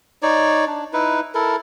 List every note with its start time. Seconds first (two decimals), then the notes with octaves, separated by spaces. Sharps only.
0.22 D#4 C#5 D5
0.67 D4
0.93 D#4 E4 B4
1.35 E4 A4 A#4